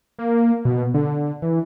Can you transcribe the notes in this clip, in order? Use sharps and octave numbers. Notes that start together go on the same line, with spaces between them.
A#3
B2
D3
E3